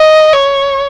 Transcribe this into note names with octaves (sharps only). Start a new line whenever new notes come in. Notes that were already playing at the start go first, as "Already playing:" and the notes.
Already playing: D#5
C#5